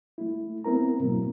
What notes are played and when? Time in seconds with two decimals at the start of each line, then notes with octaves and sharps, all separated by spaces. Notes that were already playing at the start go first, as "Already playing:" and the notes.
0.18 A3 E4
0.64 B3 C4 E4 A#4 A#5
1.00 G#2 B2 F#3 A#3